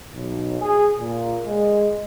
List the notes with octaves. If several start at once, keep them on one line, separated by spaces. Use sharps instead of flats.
B1
G#4
A#2
G#3